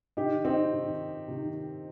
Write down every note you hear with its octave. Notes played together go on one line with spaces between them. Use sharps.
C3 D#3 D#4 G4
C4 D#4
C3 D#3
C3 D#3